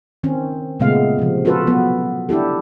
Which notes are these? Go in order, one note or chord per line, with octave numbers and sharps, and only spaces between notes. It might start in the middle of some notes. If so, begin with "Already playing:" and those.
D#3 C4 C#4
A#2 C#3 G#3 A3 B3 F5
C3 F3
C#4 F4 F#4 A4 B4
F#3 B3 B4
D4 E4 G4 A4